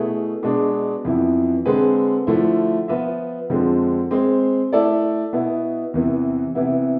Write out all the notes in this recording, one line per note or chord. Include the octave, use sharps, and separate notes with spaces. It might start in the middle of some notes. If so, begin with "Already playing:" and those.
Already playing: B2 A3 E4 G#4 B4
B2 G#3 D4 G#4
F2 E3 B3 E4
D3 G#3 C4 G#4 B4
D3 F3 A3 E4
F3 B3 F4 B4 E5
F2 D3 F3 G#3 C4
G#3 C4 G#4 C5
A3 E4 A4 D5
B2 B3 E4
E2 C3 E3 B3
C3 E3 B3 E4